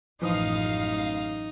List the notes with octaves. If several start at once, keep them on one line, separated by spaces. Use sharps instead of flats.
A1 F#2 E3 F3 D#4 F5 D#6